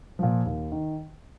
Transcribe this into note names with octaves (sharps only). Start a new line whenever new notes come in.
A#2 F3
D#2
D#3